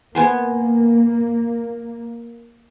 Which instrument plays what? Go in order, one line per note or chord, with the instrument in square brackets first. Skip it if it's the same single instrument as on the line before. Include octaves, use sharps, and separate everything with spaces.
[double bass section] A#3 [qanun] B3 G#5 C6